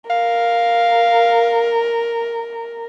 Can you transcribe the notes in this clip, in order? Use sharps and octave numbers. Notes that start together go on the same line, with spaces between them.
A#4 F5